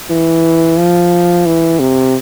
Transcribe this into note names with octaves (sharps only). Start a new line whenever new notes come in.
E3
F3
E3
C3